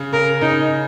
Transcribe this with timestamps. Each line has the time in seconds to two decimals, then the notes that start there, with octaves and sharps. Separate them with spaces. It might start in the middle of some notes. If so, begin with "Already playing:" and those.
Already playing: C#3
0.12 C#3 A#4
0.41 C#3 D#4